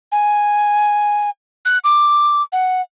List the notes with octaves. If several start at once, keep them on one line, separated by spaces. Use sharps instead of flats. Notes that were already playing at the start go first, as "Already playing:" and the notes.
G#5
F#6
D6
F#5